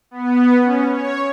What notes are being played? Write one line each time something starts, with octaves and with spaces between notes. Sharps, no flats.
B3
C#4
C#5